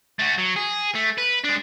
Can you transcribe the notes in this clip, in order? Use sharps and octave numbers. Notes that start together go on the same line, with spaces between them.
A3 F#4
F#3
G#4
A3
B4
G#3 D4